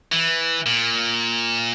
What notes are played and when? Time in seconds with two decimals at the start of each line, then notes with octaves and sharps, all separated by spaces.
0.12 E3
0.66 A#2